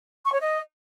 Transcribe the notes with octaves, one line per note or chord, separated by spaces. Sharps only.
C#6
C#5
D#5